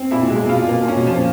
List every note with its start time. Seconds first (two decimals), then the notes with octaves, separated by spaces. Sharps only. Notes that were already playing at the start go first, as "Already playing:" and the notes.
Already playing: C4
0.11 A#2 E4
0.22 B2
0.30 A#2 G#3
0.47 B2 F4
0.60 A#2
0.69 B2 A#3
0.83 A#2
0.88 C#4
0.95 B2
1.07 A#2 F3